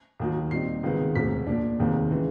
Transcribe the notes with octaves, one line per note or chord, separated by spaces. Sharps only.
D#2 D#3 F#3
A#2 G3 C4 D#4 C7
C#2 C3 D#3 G#3 B3
E1 D2 C3 B6
A#2 F3 A#3 D4
F1 D#2 D#3 G#3 C4
C#3 E3 G#3